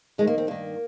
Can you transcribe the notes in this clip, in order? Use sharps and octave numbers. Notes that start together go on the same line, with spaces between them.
F2 D#3 G#3
A#3
C4
G2 D#3 A#3